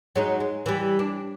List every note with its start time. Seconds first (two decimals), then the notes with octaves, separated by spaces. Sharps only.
0.16 F#3 G#3 D#4
0.40 G#3
0.66 E3 G3
0.99 D4